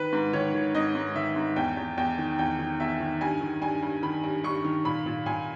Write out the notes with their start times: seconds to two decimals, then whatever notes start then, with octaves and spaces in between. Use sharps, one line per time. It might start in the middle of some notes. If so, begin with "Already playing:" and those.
Already playing: D#3 B4
0.13 G#2
0.33 D#3 C#5
0.54 D#3
0.74 G#2 D#5
0.95 G#2
1.15 D#3 E5
1.36 G#2
1.56 E2 G5
1.77 E2
1.97 E2 G5
2.18 D#3
2.39 E2 G5
2.59 D#3
2.80 E2 E5
3.00 D#3
3.21 G2 G#5
3.41 D#3
3.62 G2 G#5
3.82 G2
4.03 D#3 B5
4.24 G2
4.44 G2 C#6
4.65 D#3
4.85 A#2 B5
5.06 A#2
5.26 A#2 G#5